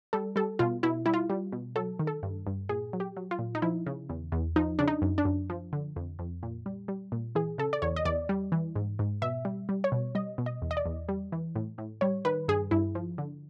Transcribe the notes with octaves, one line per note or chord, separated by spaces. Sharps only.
G3 A4
G3 A4
B2 F4
B2 E4
G3 E4
F4
G3
B2
F#3 A4
D#3
A4
G2
G2
A#2 G#4
F#3
G4
F#3
F4
A#2
D#4
F3 E4
C#3
E2
E2
F3 D#4
C#3 D4
D#4
F#2
D4
F#2
F3
D3
F2
F2
A#2
G3
G3
A#2
E3 G#4
C#3 A4
D5
E2 C#5
D#5
E2 D5
G3
E3
G#2
G#2
B2 E5
G3
G3
C#5
B2
G3 D#5
B2
D#5
E2
D#5
D5
E2
G3
E3
A2
A2
G3 C#5
D#3 B4
G2 G#4
G2 E4
F3
D3